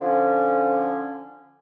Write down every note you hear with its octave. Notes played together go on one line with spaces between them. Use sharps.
D3 F3 C#4